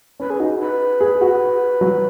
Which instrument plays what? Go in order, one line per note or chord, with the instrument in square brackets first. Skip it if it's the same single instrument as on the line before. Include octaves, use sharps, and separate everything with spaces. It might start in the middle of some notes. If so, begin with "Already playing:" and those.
[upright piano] C#4 [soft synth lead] B4
[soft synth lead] G#4
[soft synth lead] D#4 [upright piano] F#4
[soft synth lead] B4
[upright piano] G#4
F#4
F#3